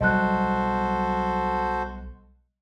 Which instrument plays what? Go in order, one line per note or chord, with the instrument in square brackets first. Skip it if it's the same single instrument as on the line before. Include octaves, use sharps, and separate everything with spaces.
[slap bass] B1 F#3 G3 [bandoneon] F#4 A4 C5 [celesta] D#5 F#6